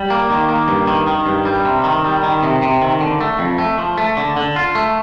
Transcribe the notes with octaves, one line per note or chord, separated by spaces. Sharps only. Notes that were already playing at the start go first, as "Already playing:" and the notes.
Already playing: G3
A#3
D#3
A#3
G2
D#3
D#3
G2
G3
C3
D#3
G3
D#3
C3
C3
D#3
D3
A3
F2
A3
F3
A3
D3
D3
F4
A3